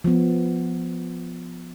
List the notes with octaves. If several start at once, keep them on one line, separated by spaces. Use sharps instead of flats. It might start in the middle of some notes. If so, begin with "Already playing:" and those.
F3 B3